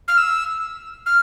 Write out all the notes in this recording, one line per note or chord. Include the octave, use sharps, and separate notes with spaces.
F6
E6
F6